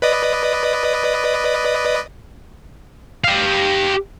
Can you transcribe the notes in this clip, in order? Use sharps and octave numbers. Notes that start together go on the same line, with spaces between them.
B4 D5 D#5
G4 F5